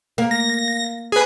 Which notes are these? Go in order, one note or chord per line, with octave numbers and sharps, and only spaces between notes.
A#3
A#6
G#4 B4